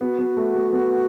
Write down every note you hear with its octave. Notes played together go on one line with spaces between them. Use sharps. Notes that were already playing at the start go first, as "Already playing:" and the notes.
B3 F#4
B3
A3
A3
B3